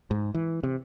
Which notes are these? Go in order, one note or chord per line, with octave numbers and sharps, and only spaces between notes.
G#2
E3
C3